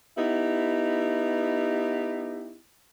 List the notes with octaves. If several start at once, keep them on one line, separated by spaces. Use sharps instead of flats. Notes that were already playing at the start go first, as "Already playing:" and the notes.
B3 D#4 E4 G4